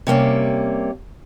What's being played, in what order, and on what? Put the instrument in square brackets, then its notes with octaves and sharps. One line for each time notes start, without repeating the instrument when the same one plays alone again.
[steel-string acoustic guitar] C3 G3 A#3 C#4